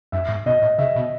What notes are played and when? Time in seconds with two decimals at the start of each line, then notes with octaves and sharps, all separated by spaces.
0.12 F#2 E5
0.29 G#2
0.46 B2 D#5
0.62 A2
0.78 C#3 E5
0.96 B2